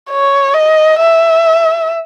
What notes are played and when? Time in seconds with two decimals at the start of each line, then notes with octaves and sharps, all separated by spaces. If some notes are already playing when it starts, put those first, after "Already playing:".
0.11 C#5
0.55 D#5
1.00 E5